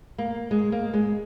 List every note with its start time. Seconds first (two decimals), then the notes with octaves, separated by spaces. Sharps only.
0.18 A#3
0.51 G#3
0.72 A#3
0.93 G#3